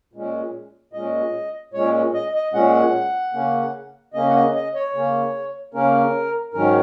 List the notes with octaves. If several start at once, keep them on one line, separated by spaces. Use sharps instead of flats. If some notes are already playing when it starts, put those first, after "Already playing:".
A#2 G#3 C#4
A#2 G#3 C#4 D#5
A#2 G#3 C#4 C#5
D#5
D#5
A#2 G#3 C#4 F#5
C#3 A#3 C#4
C#3 A#3 C#4 D#5
F#5
D#5
D#5
C#5
C#3 A#3 C#4
C#3 A#3 C#4 A#4
G#2 D#3 F#3 C#4 A#4